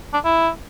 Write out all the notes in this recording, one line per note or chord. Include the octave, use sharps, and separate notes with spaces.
D4
E4